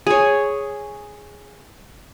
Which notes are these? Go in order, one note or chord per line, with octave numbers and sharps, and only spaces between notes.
G#4 C#5